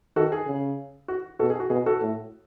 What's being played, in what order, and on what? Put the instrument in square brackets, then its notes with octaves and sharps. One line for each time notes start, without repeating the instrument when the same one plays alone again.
[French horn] D#3 [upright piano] F#4 A4
[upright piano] G#4
[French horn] C#3
[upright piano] F#4
[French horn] B2 [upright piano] F#4 A4
[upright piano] G#4
F#4
[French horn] B2 [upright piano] G#4
[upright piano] F#4 A4
[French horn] A2